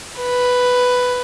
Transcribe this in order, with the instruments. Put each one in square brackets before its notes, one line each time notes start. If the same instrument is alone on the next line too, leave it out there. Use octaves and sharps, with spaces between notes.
[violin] B4